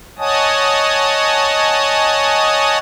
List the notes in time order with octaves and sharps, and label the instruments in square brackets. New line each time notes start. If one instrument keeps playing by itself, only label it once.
[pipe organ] C#5 D#5 F#5 G#5 A5 D#6